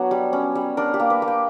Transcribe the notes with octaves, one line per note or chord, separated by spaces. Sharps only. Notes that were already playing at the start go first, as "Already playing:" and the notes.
Already playing: F#3 B3 D4 C#5
G3
C#4
G3
D4 A#4
G4
A#3
B4
A#3
G5